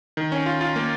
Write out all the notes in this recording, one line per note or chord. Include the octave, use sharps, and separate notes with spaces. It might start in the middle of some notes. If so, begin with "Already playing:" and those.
D#3
C#4
F4
F4
A#3